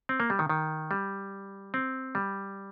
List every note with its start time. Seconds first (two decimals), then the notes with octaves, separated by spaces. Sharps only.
0.09 C4
0.20 A#3
0.30 G3
0.39 D#3
0.50 D#3
0.91 G3
1.74 C4
2.15 G3